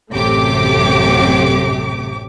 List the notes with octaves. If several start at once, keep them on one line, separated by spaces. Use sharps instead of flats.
A1 F#2 C3 A3 G4 D6